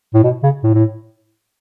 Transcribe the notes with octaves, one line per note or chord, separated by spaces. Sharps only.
A2
B2
C#3
A2
A2